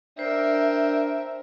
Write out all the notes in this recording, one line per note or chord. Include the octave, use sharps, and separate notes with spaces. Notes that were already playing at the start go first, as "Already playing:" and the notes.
D4 A#4 C5 E5 G5